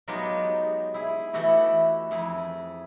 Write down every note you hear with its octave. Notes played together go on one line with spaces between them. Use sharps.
F#3 G#3 B3 D#4 F4 G4
E4 G#4
E3 A3 E4 F#4 G4
F2 E4 G#4